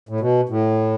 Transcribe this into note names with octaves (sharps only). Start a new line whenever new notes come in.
A2
B2
A2